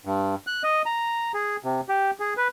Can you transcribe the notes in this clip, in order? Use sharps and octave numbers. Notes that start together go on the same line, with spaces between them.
G2
F#6
D#5
A#5
G#4
C3
G4
G#4
B4